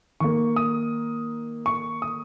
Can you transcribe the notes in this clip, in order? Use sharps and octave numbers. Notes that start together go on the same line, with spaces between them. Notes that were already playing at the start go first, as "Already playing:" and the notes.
D#3 A#3 C#6
D#6
C#6
D#6